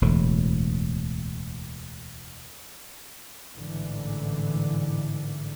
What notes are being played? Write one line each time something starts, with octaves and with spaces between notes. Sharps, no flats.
E1 D2 A2
A1 G#2 D3 E3